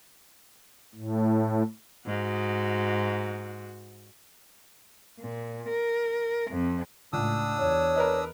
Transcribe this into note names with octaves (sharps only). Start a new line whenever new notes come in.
A2
G#2 F#4
A#2
A#4
F2
C#2 A2 D4 D#6 E6
E2 C#5
A#4 B4 D#5